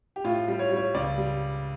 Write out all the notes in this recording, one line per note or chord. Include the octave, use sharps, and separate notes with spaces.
G4
A2 F4
G3
C#5
G3
C#5
C#2 D5
G3